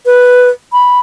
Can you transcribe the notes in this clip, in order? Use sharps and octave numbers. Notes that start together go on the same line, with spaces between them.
B4
B5